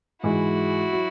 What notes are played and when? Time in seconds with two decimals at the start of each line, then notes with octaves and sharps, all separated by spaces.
0.23 G#2 E3 G#3 E4 F#4
0.93 F#3